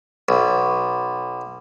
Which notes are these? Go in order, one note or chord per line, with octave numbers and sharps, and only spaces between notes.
B1